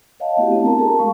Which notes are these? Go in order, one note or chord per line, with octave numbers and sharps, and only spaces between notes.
C#5 D#5 F5 F#5 A5
A3 B3 C4 E4 F#4 G4
C4 D4 A5
F#4 A#4 A#5
G#4 A4 A5
G#3 A3 F5 C#6